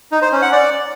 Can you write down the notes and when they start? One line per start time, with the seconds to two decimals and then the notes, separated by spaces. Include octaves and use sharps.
0.12 D#4
0.22 C5
0.32 C#4
0.42 F#5
0.52 D5